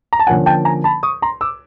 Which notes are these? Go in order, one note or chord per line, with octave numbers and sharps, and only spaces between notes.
A#5
A5
D3 F3 A#3 C#4 F#5 G#5
G5 A5
G#5 A#5
A5 B5
C#6 D#6
A#5 C6
D6 E6